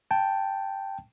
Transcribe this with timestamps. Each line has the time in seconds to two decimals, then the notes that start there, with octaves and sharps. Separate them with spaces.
0.11 G5 A5